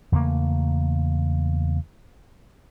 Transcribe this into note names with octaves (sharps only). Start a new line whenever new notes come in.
E2 C#3 A3 A#3